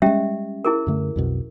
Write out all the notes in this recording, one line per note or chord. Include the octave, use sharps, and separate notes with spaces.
G3 G#3 C#4 G4 E5
E4 G#4 A#4
F#2 D3 A3
B1 F2 B2